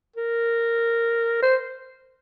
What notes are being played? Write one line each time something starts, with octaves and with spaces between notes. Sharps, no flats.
A#4
C5